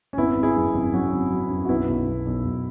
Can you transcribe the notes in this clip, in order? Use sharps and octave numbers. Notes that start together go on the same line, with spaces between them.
C#4
G#1 B3 E4
G#1
E4 G#4
F#2
G#1
F#3 C#4 F#4
G#1
F#3
F#2
F#4
B1 B3 E4
B1
B1
B1
B1